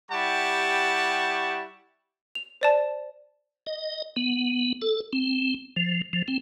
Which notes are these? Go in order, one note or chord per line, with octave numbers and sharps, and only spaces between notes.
G3 E4 G4 F#5 A5 C#6
F7
C5 D5 A5
D#5
B3
A4
C4
F3
F3
C4